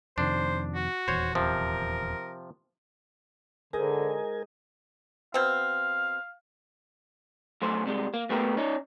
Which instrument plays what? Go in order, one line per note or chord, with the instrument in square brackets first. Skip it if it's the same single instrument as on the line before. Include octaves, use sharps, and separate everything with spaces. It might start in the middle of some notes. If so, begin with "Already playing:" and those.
[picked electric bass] F2 C3 D#3 [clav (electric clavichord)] D4 [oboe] C5
[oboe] F#4
[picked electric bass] D#1 E2 [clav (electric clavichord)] C5 C#5
[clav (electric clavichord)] C3 F3 [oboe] A#4
[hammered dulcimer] G#2 D#5 [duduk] D3 [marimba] G#4 [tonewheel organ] A#4 G#5
[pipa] B2 C4 [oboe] F5
[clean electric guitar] F#2 A3 C5
C3 G3 G#3
A#3
A#2 A3 B3 G4 A4 A#4
C#4 D#4